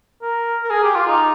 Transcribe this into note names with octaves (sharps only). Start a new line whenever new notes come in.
A#4
A#4
G#4
G4
F4
D#4